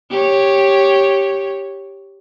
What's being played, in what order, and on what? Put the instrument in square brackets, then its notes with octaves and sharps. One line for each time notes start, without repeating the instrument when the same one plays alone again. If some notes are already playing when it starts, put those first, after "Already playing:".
[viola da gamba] G4 C#5